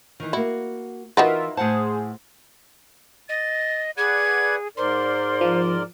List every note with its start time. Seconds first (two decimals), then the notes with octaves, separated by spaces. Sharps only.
0.20 D#3 E3
0.33 A#3 E4 F#4
1.17 E3 D#4 F4 F#4 A#4 B4 E5
1.57 A2 G#4 C5 F#5 A5
3.29 D#5 A6
3.97 G#4 B4 D5 F#5 G#6
4.77 G#2 A#4 C5 D5 C6
5.41 F3